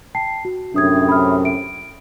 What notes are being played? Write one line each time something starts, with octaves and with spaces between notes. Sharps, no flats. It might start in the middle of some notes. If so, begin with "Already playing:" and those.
G5 A5 C7
F#4
F#2 A2 C3 D4 D#6 G#6
B5 D#6 F6
D7